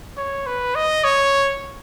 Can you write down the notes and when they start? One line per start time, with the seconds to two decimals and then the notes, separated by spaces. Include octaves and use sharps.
0.17 C#5
0.46 B4
0.75 D#5
1.04 C#5